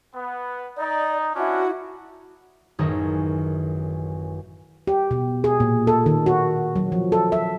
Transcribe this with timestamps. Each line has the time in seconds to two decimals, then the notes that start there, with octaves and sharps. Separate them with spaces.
0.14 B3
0.77 D#4 D5
1.35 C#4 D4 E4 F#4
2.79 A1 F#2 D#3 D#4 G#4 A4
4.87 G4
5.11 B2
5.44 G#4
5.60 A#2
5.87 A4
6.06 D#3
6.26 F#4
6.76 F#3
6.92 F3
7.12 A4
7.32 E5